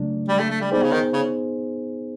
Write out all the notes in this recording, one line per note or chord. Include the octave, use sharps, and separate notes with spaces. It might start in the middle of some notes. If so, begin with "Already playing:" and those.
Already playing: C#3 F#3 A3 D4
G3
A3
A3
G3
G3 B3 D#4 G#4 C5
C#3
D#3
C#3